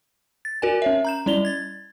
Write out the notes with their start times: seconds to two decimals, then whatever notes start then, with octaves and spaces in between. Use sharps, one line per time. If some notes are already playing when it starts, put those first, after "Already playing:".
0.45 A6
0.62 F#4 A#4 D5 G#5
0.82 C#4 C#5 E5
1.05 A#5 G6 E7
1.26 G3 C#4 E4 D5 F7 G7
1.45 G#6 A6